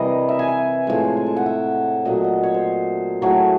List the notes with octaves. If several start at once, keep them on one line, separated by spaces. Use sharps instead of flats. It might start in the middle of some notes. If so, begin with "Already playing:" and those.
Already playing: C3 E3 G3 A#4 D#5
E5
G#5
E5
A2 F3 G#3
G#5
A5
F#5
E5
A#2 F#3 A3 D#5
D#5
C#5
C5
A2 F#3 A3 G#4